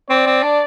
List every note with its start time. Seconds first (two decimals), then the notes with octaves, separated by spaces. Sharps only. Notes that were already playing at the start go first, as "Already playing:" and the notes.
0.10 C4 D5
0.27 C4
0.43 D4